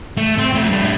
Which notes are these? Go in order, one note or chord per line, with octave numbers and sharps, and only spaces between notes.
A3
C4
F2 A3
G2 A3